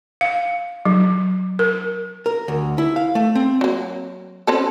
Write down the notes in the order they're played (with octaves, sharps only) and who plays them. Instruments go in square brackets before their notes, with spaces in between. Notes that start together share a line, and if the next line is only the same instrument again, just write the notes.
[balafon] F5
F#3
A#4
[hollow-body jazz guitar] A#4
D2
E4
F5
A3
C4
[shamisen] F#3 A#3
C4 C#4 A4